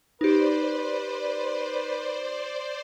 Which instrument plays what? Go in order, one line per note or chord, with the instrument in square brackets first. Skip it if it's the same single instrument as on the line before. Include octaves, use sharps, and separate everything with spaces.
[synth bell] D#4 G4 [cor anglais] B4 [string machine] C5 D5